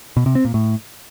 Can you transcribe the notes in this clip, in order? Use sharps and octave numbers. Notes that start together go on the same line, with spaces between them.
B2
C3
C4
A#2
A2